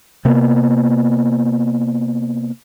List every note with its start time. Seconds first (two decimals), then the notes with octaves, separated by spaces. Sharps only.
0.25 C3 A#3 B3